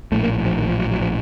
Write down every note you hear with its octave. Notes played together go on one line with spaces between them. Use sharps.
A#1 A2 A3
A#3
F3
D#3
F3
F#3
F#3
F3